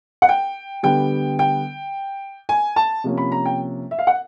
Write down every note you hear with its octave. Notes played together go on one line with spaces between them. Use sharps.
F#5
G5
D3 G3 B3 G5
G5
G#5
A5
C3 F3 A#3 C#4
B5
A#5
G5
E5
F5
F#5